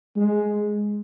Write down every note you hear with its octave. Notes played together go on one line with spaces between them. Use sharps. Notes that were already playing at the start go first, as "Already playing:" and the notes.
G#3